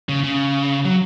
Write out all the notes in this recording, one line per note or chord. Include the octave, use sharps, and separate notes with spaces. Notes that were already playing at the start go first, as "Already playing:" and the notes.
C#3
C#3
F#3